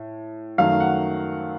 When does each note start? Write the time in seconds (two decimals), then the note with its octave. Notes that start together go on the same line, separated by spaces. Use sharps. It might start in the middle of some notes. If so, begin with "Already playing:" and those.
Already playing: A2
0.58 F#2 D#3 F#3 A3 F5
0.80 F#5